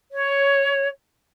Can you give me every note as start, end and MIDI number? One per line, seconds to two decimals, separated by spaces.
0.11 0.87 73